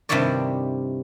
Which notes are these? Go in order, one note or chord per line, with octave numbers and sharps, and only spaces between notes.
G2 C3 D#3 E4 C#5 D5